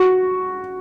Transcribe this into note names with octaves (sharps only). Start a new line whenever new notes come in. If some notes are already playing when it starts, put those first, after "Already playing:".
Already playing: F#4